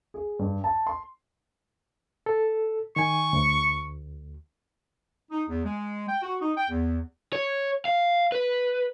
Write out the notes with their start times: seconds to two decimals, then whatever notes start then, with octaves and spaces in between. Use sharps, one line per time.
0.14 G#4
0.39 G2
0.64 A5
0.87 C6
2.26 A4
2.96 D#3 G#5 C#6
3.33 D2
5.31 D#4
5.49 E2
5.65 G#3
6.08 G5
6.22 F#4
6.42 D#4
6.57 G5
6.69 E2
7.33 C#5
7.85 F5
8.32 B4